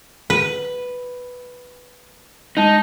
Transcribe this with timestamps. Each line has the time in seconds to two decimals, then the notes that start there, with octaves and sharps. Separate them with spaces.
0.30 B4
2.57 G#3 D#4 A5